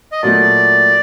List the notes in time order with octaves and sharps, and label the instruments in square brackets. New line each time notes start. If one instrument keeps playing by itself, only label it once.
[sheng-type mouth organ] D#5
[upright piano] A#2 F#3 A3 [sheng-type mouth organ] D5